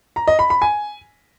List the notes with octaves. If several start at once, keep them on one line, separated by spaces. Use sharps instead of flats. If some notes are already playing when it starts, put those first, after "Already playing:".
A#5
D#5
B5
B5
G#5